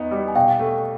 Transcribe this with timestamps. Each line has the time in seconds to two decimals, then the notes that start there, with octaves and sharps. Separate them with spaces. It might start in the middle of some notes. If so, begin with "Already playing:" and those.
Already playing: E2 B3 D#4
0.11 G3
0.28 G#5
0.35 B2 F5 G5
0.59 A3